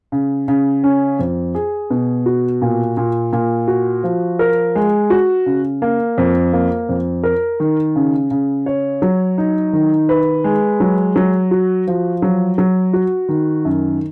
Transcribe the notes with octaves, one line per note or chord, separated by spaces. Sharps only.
C#3
C#3
C#4
F2
G#4
B2
F#4
A#2
A#2
A#2
F#4
F3
A#4
G#3
F#4
C#3
A#3
F2
A#3
F2
A#4
D#3
C#3
C#3
C#5
F#3
D#4
D#3
B4
G#3
F#3
F#3
F#4
F3
F#3
F#3
F#4
D#3
F#2